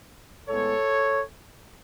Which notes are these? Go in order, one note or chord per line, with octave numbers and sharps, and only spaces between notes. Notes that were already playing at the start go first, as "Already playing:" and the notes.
A2 G#3 B3 A4 C#5